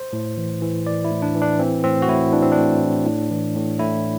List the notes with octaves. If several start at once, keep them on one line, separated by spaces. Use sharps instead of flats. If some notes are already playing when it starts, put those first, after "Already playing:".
Already playing: C5
A2
E3
E3
E3 D5
E4
A2
D4
E3
D4
E3 C4
A2 C4
F#4
A2 E4
E3 D4
C4
D4
A2
A2
A2
E3
A2
A2 E4